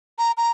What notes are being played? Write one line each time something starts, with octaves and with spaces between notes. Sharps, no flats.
A#5
A#5